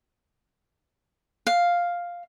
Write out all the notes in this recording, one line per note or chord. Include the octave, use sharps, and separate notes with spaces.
F5